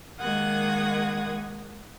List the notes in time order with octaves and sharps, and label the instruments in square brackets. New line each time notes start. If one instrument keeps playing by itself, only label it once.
[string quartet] D#3 G#3 A#3 F#5 D#6 G#6